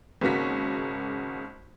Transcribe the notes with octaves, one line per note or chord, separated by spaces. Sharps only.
G#1 C#3 A#3 F#4 B6